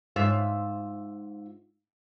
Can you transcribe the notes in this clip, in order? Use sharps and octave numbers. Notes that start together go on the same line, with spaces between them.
G#2 F4 E5